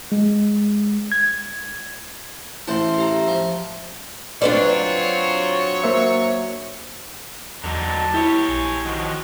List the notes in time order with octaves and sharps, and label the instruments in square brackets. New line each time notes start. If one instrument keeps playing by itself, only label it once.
[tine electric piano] G#3
G#6
[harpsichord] A1 C5 A5 [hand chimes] E4 E5 C6
[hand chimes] G4 E5 A#5
[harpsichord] F3
[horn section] F#3 C#5 [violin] C4 F4 [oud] D4 B4 D5
[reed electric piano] A#3 C5 E5
[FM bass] E2 [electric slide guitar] D3 F#3 D#4 [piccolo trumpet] A5
[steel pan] E4 [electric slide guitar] G4 C#5
[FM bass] A#1 [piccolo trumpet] G#5
[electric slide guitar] D#3 F3 [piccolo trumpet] F#4